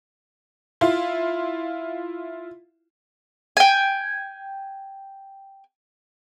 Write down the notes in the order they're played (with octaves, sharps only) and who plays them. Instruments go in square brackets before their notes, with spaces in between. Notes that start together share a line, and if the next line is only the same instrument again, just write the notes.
[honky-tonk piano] E4 F4
[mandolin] G5 G#5